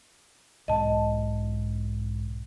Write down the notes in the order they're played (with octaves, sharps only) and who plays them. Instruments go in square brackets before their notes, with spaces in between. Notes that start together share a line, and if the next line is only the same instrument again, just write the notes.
[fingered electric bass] B1 G#2 [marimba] D#5 A5